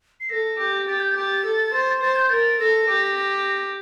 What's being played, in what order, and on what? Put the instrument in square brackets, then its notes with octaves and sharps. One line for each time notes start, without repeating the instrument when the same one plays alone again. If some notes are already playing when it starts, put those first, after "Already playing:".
[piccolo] C7
[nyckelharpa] A4 [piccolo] A#6
[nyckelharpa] G4
[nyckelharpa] G4 [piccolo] A6
[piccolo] G6
[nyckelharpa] G4 [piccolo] A6
[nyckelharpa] A4
C5
[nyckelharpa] C5 [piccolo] A6
[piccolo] G6
[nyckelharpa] A#4 [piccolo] A6
[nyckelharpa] A4 [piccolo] A#6
[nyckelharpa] G4
[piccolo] A#6